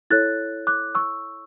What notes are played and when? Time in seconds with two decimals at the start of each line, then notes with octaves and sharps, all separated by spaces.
0.10 E4 A4 C#5 F#6 A6
0.67 D6 F#6
0.95 C#6 E6